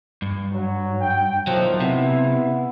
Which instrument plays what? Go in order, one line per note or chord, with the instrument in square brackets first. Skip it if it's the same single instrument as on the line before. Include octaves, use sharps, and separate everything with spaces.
[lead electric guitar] G2
[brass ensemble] F#3
G5
[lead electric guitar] B1 F#3 [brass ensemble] A2 D#3 F3
[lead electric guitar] C3 [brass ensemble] B3 E4